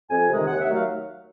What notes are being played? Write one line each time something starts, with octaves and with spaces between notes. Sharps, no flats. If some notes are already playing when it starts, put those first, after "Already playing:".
F2 G#5
C3 D#3 G#3
D#2 F#5
E5
D#3 F#3 A3
F5